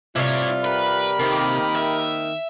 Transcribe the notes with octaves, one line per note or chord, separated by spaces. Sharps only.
C3 D#3 G3 E4 F4 C#5
G4 A#4 B4 B5
C3 D#3 A#3 C4
E5